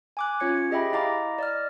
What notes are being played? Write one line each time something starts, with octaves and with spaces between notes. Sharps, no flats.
G#5 D6 F#6
C#4 F4 C#5 G#6 C#7
G4 G#4 D#5 E5 G5 B5
E4 D#5 F5 A#5 D6
D5 D#5 F6